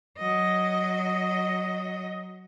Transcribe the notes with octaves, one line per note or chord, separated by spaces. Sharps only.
F#3 D#5